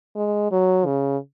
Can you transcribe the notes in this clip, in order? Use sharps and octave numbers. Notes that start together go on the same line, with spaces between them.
G#3
F#3
C#3